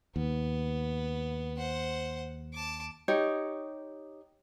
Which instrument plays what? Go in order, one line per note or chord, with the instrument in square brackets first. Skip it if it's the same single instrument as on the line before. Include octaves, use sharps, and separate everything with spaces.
[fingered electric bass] D#2 [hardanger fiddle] B3
[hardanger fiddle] C5 F#5
A5 D6
[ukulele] D#4 G4 C#5